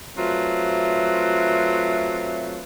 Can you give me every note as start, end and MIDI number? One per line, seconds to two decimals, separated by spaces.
0.17 2.63 54
0.17 2.63 57
0.17 2.63 60
0.17 2.63 65
0.17 2.63 71
0.17 2.63 76